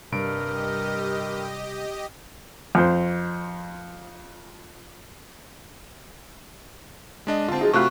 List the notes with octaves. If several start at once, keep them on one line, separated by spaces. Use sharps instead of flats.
G2 C3 G3 G4 A#4 D#5 D7
F2 C5
G#3 D4 D#5
D3 C4 F4 A5
F#3 D#4 G#4
C3 A3 F4 F#4 B5 C#6 F#6